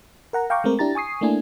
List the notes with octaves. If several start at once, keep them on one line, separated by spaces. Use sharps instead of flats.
A#4 F#5 A#5
F5 G5 A#5 C#6 D6
G#3 A3 C4 A#4
D4 E4 G4 A#5 A6
G#5 C#6 D#6 C7
A3 A#3 D4 E4 G#5